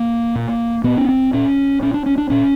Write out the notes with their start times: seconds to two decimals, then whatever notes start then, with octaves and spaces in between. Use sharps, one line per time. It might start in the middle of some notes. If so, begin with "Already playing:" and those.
Already playing: A#3
0.35 A#2
0.84 A#2 B3
0.97 C#4
1.09 C4
1.33 A#2 C#4
1.82 A#2 C#4
1.94 D4
2.06 C#4
2.18 D4
2.30 A#2 C#4